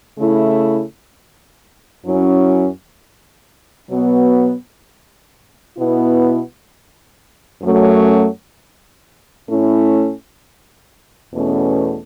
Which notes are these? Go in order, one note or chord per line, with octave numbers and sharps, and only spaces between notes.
C#3 A3 E4
F#2 F#3 C#4 E4
B2 F#3 B3
B2 B3 E4
F#2 F#3 A3 C#4
A2 A3 C#4 E4
E2 B2 A3 C#4